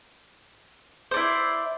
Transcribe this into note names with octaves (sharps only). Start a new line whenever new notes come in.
E4 C5 D5